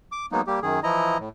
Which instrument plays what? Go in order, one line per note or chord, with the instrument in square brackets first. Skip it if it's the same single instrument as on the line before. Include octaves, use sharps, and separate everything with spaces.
[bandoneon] D6
F#3 G#3 A#3 B3 D#4
G3 A#3 G4
F#2 D#3 G#4
E3 F3 E4 D#5 A#5
A2